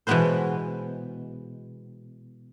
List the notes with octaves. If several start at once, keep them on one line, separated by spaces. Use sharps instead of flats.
B2 E3 G#3 B3 B4 C5